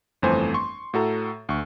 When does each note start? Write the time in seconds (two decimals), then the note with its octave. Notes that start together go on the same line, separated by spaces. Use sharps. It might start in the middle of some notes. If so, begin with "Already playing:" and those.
0.22 G1 F2 E3 A3 C5 G#5
0.54 C6 C#6
0.94 A2 F#4 A4 A#5
1.49 D2 C#6